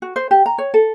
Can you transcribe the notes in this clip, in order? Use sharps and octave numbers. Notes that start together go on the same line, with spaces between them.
F#4
C5
G4
A#5
C#5
A4